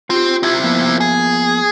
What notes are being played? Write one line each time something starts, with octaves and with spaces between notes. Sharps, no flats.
C4 F4 G4
C4 E4
F3 A#3 B3
G#4